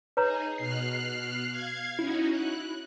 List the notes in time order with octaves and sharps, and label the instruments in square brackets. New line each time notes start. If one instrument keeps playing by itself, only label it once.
[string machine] D#4 G#4 [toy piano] B4 C#5 A#5
[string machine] B2 F6 F#6 [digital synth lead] C7
[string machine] F5 G#6
[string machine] C#4 D#4 F#4 [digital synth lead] E4
[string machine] F#6